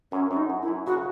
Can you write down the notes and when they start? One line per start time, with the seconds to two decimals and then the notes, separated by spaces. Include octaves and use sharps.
0.12 F#2 C#4
0.31 F#2 C#4
0.37 D#4
0.50 F#2
0.62 E4
0.68 F#2
0.87 C#3 F#4